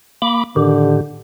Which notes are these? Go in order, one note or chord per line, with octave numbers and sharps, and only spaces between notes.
A#3 B5 D6
A2 D3 D#3 G4